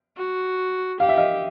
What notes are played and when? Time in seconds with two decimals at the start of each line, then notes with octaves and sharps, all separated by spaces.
0.17 F#4
1.00 G4 F5
1.09 E5
1.17 D#5 F5